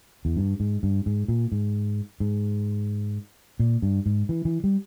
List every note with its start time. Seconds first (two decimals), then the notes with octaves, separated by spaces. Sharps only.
0.25 E2
0.37 G2
0.60 G#2
0.83 G2
1.06 G#2
1.28 A#2
1.52 G#2
2.20 G#2
3.60 A#2
3.82 G2
4.06 G#2
4.29 E3
4.45 E3
4.64 G3